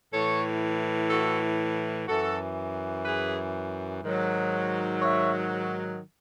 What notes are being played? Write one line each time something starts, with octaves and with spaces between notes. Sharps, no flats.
A2 E3 A4 C#5
F#4 A4
F#2 E3 F#4 A4
G#4 B4
G#2 D#3 F#3
C#5 E5